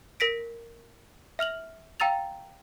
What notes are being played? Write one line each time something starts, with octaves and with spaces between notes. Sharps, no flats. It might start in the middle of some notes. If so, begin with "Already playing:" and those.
A#4 A#6 B6 D7
E5 F6 F7 F#7
F5 G5 A#5 E6 A6 F7